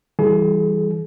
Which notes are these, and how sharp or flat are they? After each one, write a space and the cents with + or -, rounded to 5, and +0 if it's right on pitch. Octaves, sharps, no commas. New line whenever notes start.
E3 +0 G3 +0 G#4 +40